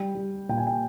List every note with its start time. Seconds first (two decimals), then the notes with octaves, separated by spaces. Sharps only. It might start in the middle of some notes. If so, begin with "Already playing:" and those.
Already playing: G3 G5
0.15 G3
0.49 A#2 G5
0.57 G#5
0.67 G5